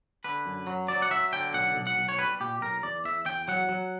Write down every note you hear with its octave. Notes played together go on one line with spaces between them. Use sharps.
D3 B4
F#2
F#3
F#3 D5
F#5
F#3 E5
D3 G5
B1 F#5
B1
F#5
B1
C#5
G3 B4
A#2 G4
B1 A#4
E2 D5
E2 E5
E2 G5
F#3 F#5
F#3